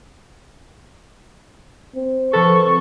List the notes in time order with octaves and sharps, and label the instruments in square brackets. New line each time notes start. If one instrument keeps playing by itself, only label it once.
[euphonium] C4
[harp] F3 B4 [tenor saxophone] A4 [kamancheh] C#6